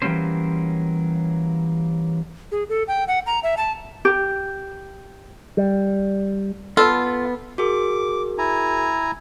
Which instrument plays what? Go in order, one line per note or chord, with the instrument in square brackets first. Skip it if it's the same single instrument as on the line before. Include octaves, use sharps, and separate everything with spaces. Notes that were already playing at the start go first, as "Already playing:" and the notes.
[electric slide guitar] E3 F#3 G3 A#3 C#4 C5
[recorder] G#4
A4
G5
F#5
A#5
E5
A5
[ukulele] G4
[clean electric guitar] G3
[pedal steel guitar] B3 [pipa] F4 [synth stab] A4
[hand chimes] F#4 G#4 A#4 [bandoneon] D6
[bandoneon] E4 G#5 A#5